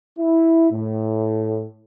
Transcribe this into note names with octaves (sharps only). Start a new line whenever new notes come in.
E4
A2